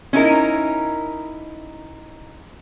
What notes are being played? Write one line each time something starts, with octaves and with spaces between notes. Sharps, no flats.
C#4 D#4 E4 A#4